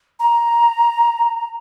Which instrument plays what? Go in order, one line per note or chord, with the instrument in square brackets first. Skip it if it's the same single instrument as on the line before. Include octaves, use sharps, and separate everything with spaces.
[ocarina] A#5